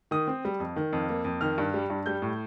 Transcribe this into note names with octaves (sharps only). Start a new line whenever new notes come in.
D#3 D#6
C4
G3
F2
D#3
F2
A#3
F2
D#3 F6
G2
G3
G2
G3 G6
A2